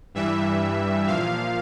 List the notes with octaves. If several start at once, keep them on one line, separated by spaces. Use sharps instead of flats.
G2 E3 G3 E5
A#2 F3 F5